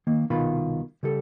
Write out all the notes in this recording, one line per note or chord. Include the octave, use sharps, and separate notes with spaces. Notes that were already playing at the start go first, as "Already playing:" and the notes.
D#3 A#3
C2 B2 D#3 F4 B5
C#3 G3 A4